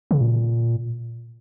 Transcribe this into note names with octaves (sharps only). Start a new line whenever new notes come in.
C#3
A#2